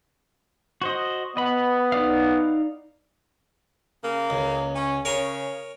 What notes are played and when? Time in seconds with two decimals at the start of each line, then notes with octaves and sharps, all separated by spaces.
0.82 F#4 C5 D#5
1.37 B3 D#5 B5
1.92 D#4 D5 F5
4.03 C#3 A#3
4.30 C#2
4.76 C#4
5.05 C#3 A#4 C#5 G#5